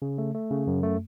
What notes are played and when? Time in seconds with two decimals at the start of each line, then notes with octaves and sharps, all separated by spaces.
0.02 C#3
0.18 A3
0.35 A3
0.51 C#3
0.67 F#2
0.83 A3